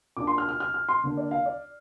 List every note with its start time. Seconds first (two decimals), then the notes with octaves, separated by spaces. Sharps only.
0.17 A#2 A#3 D4 D6
0.27 C6
0.38 F6
0.49 F6
0.60 F6
0.74 F6
0.89 C6
1.03 D3 A#3 D4
1.17 D5
1.31 F5
1.46 D5